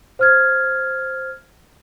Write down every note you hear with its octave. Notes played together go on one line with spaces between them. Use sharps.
C5 F6 G#6